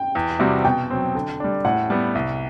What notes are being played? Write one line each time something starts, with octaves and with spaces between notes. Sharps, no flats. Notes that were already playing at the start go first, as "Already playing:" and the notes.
Already playing: G5
E2
C3 G3 C4 F#4
B2 G5
F#3 C4
D3
G3 D4
A2 F#5
G3 B3
C2